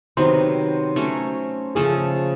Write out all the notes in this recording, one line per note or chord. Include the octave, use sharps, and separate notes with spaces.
C3 D#3 F#3 B3 C5
F#3 A3 C#4
C#3 F3 A3 G#4